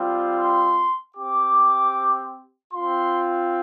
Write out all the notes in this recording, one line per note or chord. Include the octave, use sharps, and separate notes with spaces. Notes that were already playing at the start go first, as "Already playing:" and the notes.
Already playing: G3 C4 F4
C6
C4 G4 D6
C4 F4 C6